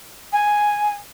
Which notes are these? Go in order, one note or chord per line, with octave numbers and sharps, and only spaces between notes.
G#5